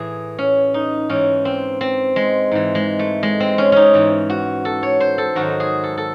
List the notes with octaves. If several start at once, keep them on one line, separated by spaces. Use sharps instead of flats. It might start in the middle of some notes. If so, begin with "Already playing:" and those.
Already playing: A2 E3 G#4
C#4
D#4
G#2 E3 C#4
C4
C4
G#3
G#2 E3
G#3
A3
G#3
C4
C#4
C#4 D#4
G#2 E3
F#4
A4
C#5
C5
A4
G#2 D#3 F#3 F#4
G#4
A4
A4